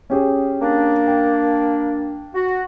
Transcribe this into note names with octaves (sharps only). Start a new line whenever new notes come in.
C#4 G4 G#4
A#3 D4
G5
F#4